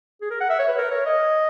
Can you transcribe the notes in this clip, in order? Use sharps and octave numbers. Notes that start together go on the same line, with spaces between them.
G#4
A#4
F#5
E5
C#5
B4
A#4
C#5
D#5